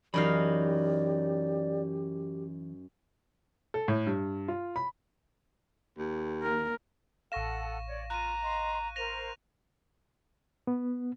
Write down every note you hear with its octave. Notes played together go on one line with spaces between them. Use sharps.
F#2 E3 D#4 G4 D5 F5 B5
A4
A2
G2
F4
B5
D#2
A#3 A#4
A1 A4 F5 F#5 C#6 A#6 E7
C#5 D5
F4 A#5 F#6 D#7
D#5 C6
A#4 C5 A#6 D#7 F7
B3